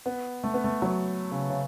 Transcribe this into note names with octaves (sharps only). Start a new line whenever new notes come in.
B3
A3
B3
A3
F#3
C#3
C#3